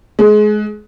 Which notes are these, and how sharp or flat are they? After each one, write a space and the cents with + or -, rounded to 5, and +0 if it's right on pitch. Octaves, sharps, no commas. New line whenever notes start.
G#3 +25